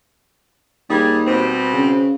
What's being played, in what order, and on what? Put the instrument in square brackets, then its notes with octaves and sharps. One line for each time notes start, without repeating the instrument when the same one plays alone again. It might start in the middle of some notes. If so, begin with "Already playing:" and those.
[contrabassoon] D#2 [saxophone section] G3 G#4
[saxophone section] B2 G3 C4
[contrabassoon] C#3